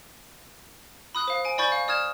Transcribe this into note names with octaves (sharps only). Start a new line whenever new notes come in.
B5 D#6 F#6
C5 F5
G#5 D7
D5 G#5 B5 C#6 G6 A6
F5
D5 D#6 F6 G#6 E7